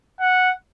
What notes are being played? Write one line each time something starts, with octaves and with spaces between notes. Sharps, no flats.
F#5